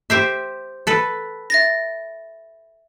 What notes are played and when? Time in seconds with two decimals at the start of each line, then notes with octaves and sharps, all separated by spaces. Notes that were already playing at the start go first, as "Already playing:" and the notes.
0.10 G4 C5 E5
0.87 A4 B4
1.50 E5 A6 A#6